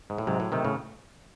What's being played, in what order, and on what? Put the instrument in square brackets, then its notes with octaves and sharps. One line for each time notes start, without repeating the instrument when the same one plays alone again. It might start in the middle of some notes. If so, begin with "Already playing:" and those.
[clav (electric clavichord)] G#2
A2
[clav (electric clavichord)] G#2 C3 [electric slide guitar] F#3
[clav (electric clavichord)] A2
[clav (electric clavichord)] C3 D#3 [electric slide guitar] A3
[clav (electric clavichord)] A2 C#3